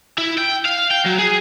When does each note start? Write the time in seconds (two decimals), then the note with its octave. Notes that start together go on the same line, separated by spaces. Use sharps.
0.18 E4
0.38 G5
0.65 F5
0.91 G5
1.05 F#3
1.18 G#4